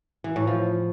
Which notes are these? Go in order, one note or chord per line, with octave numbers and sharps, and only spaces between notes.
E3
A2
F3